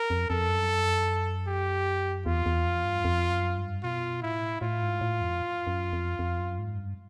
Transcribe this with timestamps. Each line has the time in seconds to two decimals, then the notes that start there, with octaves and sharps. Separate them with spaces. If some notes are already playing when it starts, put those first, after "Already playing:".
Already playing: A#4
0.10 F2
0.30 F2 A4
0.49 F#2
1.47 G4
2.26 E2 F4
2.46 E2
2.65 F2
2.85 G2
3.05 F2
3.30 F#2
3.57 G2
3.83 B2 F4
4.23 A2 E4
4.61 A2 F4
4.82 G#2
5.01 A2
5.21 F2
5.67 F#2
5.93 F2
6.19 F2
6.39 F#2
6.59 G#2
6.78 G2